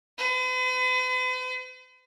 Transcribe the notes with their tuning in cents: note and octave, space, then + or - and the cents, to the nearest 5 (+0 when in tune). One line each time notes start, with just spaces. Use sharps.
B4 +45